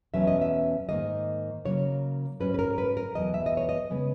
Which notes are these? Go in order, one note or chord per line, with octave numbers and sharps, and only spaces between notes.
E2 B2 F#3 C#4 E5
D#5
E5
G#2 D#3 F#3 A#3 D#5
C#3 F#3 A#3 C#5
G#2 F#3 C#4 B4
B4
A#4
B4
A#4
E2 B2 F#3 D#5
E5
D#5
C#5
D#5
C#3 G#3 B3